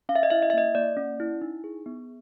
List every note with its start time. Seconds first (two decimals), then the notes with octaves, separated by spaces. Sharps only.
0.09 C#4 F5
0.16 E5
0.23 D#5
0.30 E4 E5
0.42 D#5
0.50 E5
0.53 A#3 D#5
0.75 A#3 D5
0.97 C#4
1.20 E4
1.42 D#4
1.64 G#4
1.86 B3